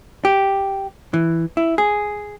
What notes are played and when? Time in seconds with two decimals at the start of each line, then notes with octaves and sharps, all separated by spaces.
0.25 G4
1.14 E3
1.57 E4
1.78 G#4